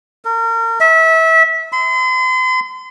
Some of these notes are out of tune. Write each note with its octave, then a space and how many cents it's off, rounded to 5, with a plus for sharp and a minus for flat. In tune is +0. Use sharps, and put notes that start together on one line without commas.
A#4 -35
E5 -25
C6 -40